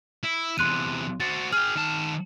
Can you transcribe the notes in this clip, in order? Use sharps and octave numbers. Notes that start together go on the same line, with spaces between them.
E4
E2 C3 C6 F#6 D#7
F#4 C5 A6
G#4 G5 F6
D#3 A5